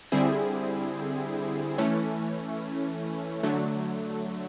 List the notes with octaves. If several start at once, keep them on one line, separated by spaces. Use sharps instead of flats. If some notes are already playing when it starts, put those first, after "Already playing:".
D3 G3 C4 E4 G#4
E3 A3 C#4
D3 F#3 A3